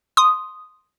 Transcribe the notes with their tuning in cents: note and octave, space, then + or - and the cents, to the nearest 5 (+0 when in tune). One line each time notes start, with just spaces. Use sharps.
C6 +0 D#6 +0